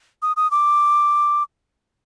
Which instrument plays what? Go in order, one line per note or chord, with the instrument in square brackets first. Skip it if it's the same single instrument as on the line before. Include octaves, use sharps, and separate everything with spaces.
[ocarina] D#6
D#6
D6